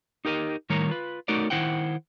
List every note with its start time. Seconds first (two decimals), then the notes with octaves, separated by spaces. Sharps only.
0.25 D#4 G4 A#4 C#5 D#5
0.70 A2 D#3 G3 A#4 C#5 A#5
0.90 F4 B4
1.28 A3 D#4 F#4 A#4 C#5 D5
1.50 D#3 G3 E4 C5 F#5 G5